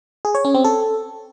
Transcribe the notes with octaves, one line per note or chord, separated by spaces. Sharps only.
G#4
C#5
C#4
C4
A4